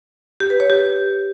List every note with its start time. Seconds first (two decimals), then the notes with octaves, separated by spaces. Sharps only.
0.40 G4
0.50 B4
0.60 C#5
0.70 G4